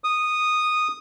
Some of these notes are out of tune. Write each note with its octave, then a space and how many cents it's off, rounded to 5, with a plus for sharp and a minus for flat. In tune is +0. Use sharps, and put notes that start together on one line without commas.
D#6 -10